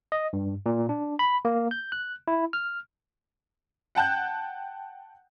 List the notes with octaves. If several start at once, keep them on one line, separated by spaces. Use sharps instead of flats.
D#5
G2
A#2
D4
B5
A#3
G6
F#6
E4
F6
F#5 G5 A5 F#6 G6